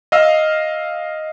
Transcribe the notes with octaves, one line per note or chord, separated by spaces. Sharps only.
D#5 F5 E6